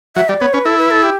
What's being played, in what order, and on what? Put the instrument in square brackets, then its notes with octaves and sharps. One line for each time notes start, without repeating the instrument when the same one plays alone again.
[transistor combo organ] F#3 [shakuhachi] E5
[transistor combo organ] G3 [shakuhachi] D5
[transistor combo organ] B3 [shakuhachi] C#5
[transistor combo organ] C#4 [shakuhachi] B4
[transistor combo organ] E4 [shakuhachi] A4
[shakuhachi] B4
A4
G4